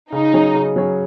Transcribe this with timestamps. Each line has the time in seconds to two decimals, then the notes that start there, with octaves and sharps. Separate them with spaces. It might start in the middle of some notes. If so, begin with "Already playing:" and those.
0.12 C#3 D#4
0.33 F#3 C#4 G#4 C#5
0.55 C#3
0.76 F#3 C#4 G#4 C#5